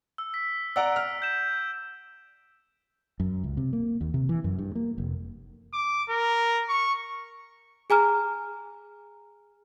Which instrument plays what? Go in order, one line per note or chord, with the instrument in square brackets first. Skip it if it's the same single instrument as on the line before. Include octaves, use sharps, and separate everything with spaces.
[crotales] E6
B6
[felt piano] D5 F#5 A#5 [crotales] E6 D7
[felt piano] F6
[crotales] G6 E7
[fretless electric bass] F#2
C#2
C3
A#3
D#2
C3
E3
F#2
G2
A#3
F1
[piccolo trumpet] D6
A#4
C#6
[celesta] G#4 G#5 A#5 F6